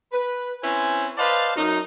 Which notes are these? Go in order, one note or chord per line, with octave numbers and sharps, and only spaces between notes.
B4
C4 C#4 E4 B4 C5 G#5
B4 C5 D5 D#5 F5 A5
F#2 D#4